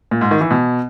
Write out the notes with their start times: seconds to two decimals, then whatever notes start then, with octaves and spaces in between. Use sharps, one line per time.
0.11 A#2
0.21 G#2
0.31 D#3
0.41 E3
0.51 B2